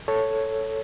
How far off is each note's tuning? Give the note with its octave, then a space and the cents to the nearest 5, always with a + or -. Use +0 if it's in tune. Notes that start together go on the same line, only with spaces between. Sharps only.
A4 +0 C#5 +0